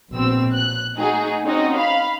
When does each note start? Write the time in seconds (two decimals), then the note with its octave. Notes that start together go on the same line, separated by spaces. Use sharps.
0.12 A#1 B2 C4 E6
0.53 F#6
0.97 A3 D#4 F#4 G#4
1.45 C4 C#4 D#4 F#4 D#5
1.77 F5 B5